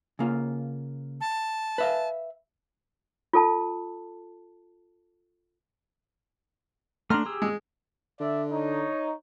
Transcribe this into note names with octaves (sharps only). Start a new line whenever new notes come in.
C#3 A#3 F4
A5
B4 E5 F5
F4 A4 A5
A3 D4 A#5 C6 F6
G4 G#4 E6
G#3
D3 D5 E5
D#4 C#5